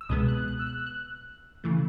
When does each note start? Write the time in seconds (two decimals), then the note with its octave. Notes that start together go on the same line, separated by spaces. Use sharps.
0.01 E6
0.09 C#2 B2 G#3 B3 D#6
0.28 F#6
0.48 F#6
0.59 E6
0.67 F#6
0.87 F#6
1.64 C#3 E3 A3